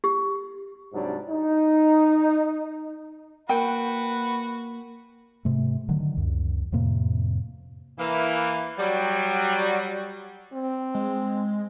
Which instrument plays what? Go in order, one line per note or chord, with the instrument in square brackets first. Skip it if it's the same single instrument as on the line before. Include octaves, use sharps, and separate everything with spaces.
[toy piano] G4
[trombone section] C2 G#2 F#3 G3 D4
D#4
[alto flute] A#3 [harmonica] F#4 B4 [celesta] A#4 [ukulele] G5
[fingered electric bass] G#2 C3 A3
D3 D#3 F#3
C#2 F#2
F2 A2 C3 A#3
[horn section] E3 A#3
F#3 G3
[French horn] C4
[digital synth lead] G#3